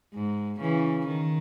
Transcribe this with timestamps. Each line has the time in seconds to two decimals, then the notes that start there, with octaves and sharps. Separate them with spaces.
0.14 G#2
0.61 C#3 E3
1.08 D#3